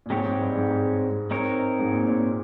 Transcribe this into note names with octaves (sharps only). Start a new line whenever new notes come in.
A#2
G#2 G#3 C4 G4 C#5
G#2
G2
G#2
G#2
C4 D#4 A#4 C#5
G#2
A#2
A#2